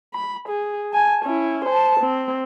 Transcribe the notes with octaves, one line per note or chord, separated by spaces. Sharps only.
B5
G#4
G#5 A5
C#4 E4
C5 A5
C4